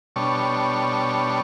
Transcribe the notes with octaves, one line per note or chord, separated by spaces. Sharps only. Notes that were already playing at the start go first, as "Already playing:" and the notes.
B2 G3 D4 C#5 A5 C#6